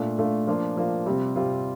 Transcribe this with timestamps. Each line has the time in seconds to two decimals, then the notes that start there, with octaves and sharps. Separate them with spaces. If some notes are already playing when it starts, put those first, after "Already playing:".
Already playing: A#2 A3 D4 F4
0.18 A#2 A3 D4 F4
0.47 F3 A#3 D4 F4
0.77 F3 A#3 D4 F4
1.06 C3 G3 C4 F4
1.36 C3 G3 C4 F4